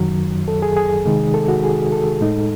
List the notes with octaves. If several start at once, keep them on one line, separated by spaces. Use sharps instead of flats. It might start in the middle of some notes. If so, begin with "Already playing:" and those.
Already playing: F#2 D#3 F#3
A4
G#4
G#4
C3 D#3 G#3 D#4
A4
F#4
G#4
A4
A2 G#3 D#4